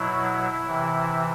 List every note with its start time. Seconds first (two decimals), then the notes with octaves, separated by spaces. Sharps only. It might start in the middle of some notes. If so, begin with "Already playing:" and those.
Already playing: B2 F#3 E4
0.67 C3 E3